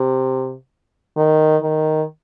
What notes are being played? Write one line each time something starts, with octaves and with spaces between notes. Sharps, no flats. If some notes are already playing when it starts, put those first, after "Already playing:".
Already playing: C3
D#3
D#3